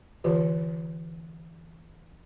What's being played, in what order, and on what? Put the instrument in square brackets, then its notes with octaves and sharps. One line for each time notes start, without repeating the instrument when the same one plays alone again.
[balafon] D3 E3 F4 G4 B4